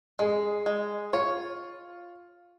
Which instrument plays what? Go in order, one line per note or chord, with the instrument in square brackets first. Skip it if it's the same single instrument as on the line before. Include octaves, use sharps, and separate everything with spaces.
[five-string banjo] G#3 [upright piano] G#4
[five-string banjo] G#3
[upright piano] F4 [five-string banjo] C#5